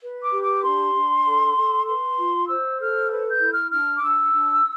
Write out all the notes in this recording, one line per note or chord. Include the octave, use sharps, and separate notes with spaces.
B4
D6
G4
D6
D4 C6
D4
A4
A4
B4 C6
F4
C5 E6
A4 F6
B4
G6
E4
F6
D4 F6
D6
D4 E6
D4